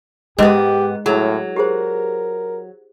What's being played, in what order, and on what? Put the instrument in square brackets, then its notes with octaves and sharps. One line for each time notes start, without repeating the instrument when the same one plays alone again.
[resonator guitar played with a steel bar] G#2 B3 [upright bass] G#3 [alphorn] G4 [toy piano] G#4 D#5
[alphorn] A2 [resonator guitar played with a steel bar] F#3 [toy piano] E4 G#4
[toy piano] G4 G#4 C5 [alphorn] A#4